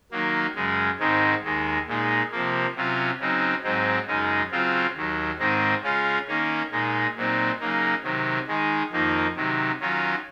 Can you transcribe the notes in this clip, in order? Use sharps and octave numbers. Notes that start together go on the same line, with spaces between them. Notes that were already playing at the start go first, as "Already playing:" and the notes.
D#3 F#3 A#3
F#2 C#3 G#3
G#2 D#3 G#3 C4 D#4
D#2 D#3 G#3
A#2 G#3 D#4
C3 F3 A#3
C3 F#3 C#4 F4
C#3 F#3 C4 D#4
G#2 F#3 C4 D#4
F#2 C#3 G#3 D#4
C#3 F#3 C4 F4
D#2 D#3 F#3
G#2 D#3 G#3 C4 D#4
C#3 G#3 C#4 F4
D#3 A#3 C#4
A#2 G#3 D#4
A#2 F#3 C4 D#4
C#3 F#3 A#3 D#4
C3 D#3 F#3
D#3 G#3 D#4
F2 D#3 A#3 D#4
C3 D#3 F#3
D#3 F#3 C#4 F4